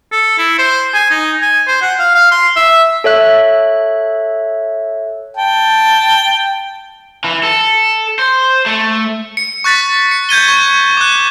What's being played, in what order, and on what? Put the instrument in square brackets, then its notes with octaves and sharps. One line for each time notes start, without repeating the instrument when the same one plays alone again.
[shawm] A4
E4
C5
G#5
D#4
G#5
C5
F#5
F5
F5
C6
E5
[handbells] A4 C#5 E5 F#6
[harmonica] G5 A5
[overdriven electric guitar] E3
A4
C5
A3
[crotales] C#7
C#6 F#6 A6 B6
C#7
G6 G#6 D#7 G7
C#6
D6 F#6